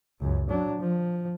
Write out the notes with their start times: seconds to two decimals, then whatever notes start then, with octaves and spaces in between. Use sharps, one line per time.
0.21 C#2 F#2
0.50 F#3 D4
0.80 F3